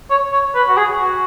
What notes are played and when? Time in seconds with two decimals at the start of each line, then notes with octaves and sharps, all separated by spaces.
0.10 C#5
0.32 C#5
0.55 B4
0.68 F#4
0.77 G#4
1.00 F#4